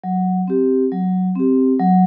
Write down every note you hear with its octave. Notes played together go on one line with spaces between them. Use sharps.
F#3
C4 G4
F#3
C4 G4
F#3